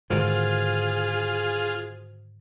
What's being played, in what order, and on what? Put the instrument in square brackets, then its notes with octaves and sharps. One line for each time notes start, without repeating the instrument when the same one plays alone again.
[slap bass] G#2 D3 D#3 [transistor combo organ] F4 [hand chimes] F#4 C5 [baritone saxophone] G#4